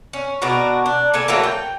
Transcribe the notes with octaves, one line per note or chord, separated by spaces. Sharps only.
C#4
B2 D4 F#4 A#4
D4
A#3 A4 G#5
E3 F#3 A3 A#3
G5